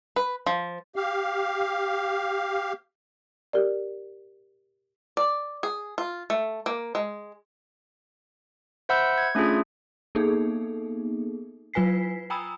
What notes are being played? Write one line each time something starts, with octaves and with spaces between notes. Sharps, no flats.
B4
F3
G4 F5
G4 A#4 D5
D5
G#4
F4
A3
A#3
G#3
C5 E5 F#5 B5 E6 G6
G#6
A3 C#4 D4 F4 G#4
A#3 B3 D#4 G#4 A4
F#3 F4 B4 G#5 B6 C7
G5 G#5 A#5 B5 D#6 E6